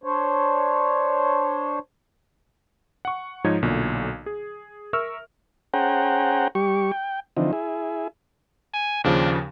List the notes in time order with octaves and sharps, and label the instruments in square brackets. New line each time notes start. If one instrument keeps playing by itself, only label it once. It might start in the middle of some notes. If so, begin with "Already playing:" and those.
[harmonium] D4 C5 C#5
[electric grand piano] F#5 C#6
G#2 F3 D#4 C#5 G#6
B1 A#2 D3 F#3
G#4
A#4 E5 C#6 E6 F6
[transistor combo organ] C#4 G#4 C5 F#5 G5 A#5
G3 G4 C#6
G5
D3 E3 F3 C4 D#4
E4 G#4
[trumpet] G#5
[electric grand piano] D#2 C#3 F3 [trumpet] D4